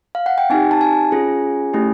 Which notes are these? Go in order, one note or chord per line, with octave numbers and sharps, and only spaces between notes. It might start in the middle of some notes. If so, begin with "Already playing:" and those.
F5
F#5
G5
C4 D#4 G4 G#5
A5
G#5
C#4 F4 G#4
A3 C#4 E4 G4